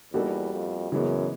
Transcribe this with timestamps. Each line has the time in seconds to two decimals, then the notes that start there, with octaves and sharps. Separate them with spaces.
0.13 E2 G3 A#3 D#4 F#4 A4
0.53 F2
0.92 F#2 C#3 E3 G#3 B3